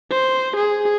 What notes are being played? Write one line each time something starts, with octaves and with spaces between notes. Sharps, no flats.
C5
G#4